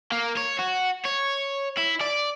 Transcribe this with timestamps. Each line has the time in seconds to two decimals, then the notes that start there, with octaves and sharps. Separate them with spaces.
0.12 A#3
0.37 C#5
0.59 F#4
1.05 C#5
1.77 E4
2.01 D5